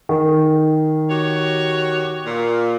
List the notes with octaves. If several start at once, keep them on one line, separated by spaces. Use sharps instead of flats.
D#3
F#4 G4 C#5
A#2